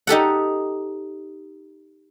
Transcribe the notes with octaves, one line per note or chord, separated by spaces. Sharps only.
D#4 G4 A4 F#5